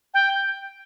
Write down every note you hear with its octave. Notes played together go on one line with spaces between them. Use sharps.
G5